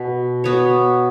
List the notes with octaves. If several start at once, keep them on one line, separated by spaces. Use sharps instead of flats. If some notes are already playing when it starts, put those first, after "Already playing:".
Already playing: B2
B3 F#4 C#5